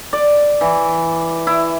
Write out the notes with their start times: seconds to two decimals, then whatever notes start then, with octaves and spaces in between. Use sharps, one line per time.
0.13 D5
0.61 E3
1.47 E4